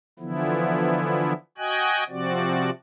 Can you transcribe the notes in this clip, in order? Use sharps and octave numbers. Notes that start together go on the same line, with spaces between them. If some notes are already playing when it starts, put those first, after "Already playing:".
D3 E3 F3 B3 E4
F#4 D#5 G5 G#5 F#6
C3 F3 C4 F#4 D5